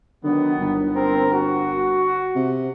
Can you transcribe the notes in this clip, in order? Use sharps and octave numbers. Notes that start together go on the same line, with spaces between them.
D3 D#3 F#3 B3
G1
C4 A#4
F#4
C3